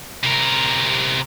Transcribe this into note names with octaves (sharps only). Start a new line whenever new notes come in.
C3 A#4